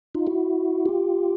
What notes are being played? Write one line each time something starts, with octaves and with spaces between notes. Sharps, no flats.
D#4 F4
E4 F#4
F4 G4